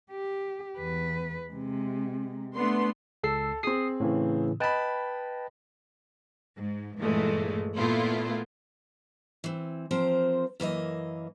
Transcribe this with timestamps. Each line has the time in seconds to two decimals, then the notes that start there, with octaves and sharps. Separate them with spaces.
0.11 G4
0.77 E2 B4
1.50 C3 G#3
2.56 A3 B3 D4 C6
3.23 C#2 A4 E6 C7
3.63 C4 G#4 D#6 C7
4.00 A2 C#3 E3
4.60 B4 D#5 G5 A5 B5
6.55 G#2
6.99 G2 A#2 E3 G#3 A3
7.76 A#2 A3 B3 E4 F4
9.44 E3 C4
9.91 F3 C4 A#4 C5
10.60 F#2 E3 A#3 D#5